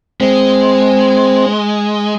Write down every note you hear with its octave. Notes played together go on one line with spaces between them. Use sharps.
G#3 C4